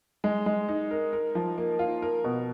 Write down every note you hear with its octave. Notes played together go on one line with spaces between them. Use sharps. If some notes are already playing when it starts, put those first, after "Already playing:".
G#3
G#3
D#4
A#4
A#4
F3
A#3
F4
A#4
B2